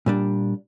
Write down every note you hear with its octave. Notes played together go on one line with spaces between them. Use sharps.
A#2 G3 D4